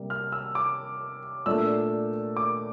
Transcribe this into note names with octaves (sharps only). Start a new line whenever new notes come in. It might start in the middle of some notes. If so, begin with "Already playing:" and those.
Already playing: C3 G3 A#3
F6
E6
D6
A#2 A3 D4 E6
D6